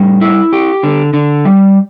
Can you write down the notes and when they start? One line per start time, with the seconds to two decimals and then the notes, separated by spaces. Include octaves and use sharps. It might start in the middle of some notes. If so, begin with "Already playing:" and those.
Already playing: A2 G3
0.21 E4
0.53 G4
0.83 D3
1.14 D3
1.45 G3